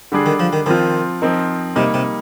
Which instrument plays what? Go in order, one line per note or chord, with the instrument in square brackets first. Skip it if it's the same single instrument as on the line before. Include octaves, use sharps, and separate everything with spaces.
[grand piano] D3 G3 D4 G#4
[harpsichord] D#3
F3
D#3
[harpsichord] D#3 [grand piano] F3 C4 F4
[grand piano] F3 C4 D#4 A#4
[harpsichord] C3 [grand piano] G3 A#3 D#4
[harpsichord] C3